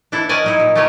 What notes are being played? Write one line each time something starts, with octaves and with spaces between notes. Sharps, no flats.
E3 D4 E4 A4
C#4 F#4 A#4 D5 D#5 G#5
F#3 D#4 E4
A#2
A3 A#3 C#4 G4 A#4 B4